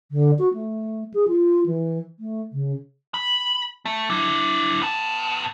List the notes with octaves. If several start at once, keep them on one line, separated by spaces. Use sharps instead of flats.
D3
F#4
A3
G#4
F4
E3
A3
C#3
B5
A3
D4 E4
B3 A5